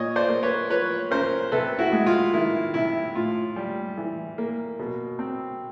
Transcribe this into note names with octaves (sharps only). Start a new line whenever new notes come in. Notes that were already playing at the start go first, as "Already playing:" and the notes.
Already playing: A#2 C#5 D#5
C5 D5
A#3
B4 C#5
F3 B4 C#5
C#4 A#4 C5
C3 A4 B4
E4 F#4
G#3
F4
D#3 E4
C3 E4
A2 F4
G3
E3
A#3
B2
C4